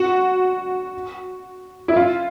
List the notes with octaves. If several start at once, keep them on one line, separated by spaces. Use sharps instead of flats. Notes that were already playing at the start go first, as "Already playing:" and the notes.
Already playing: F#4
E4
F4